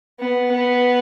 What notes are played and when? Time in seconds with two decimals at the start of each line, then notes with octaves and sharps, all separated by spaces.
0.20 B3
0.52 B3